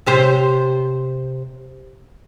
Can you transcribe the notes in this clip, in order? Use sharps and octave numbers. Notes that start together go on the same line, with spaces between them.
C3 G4 C5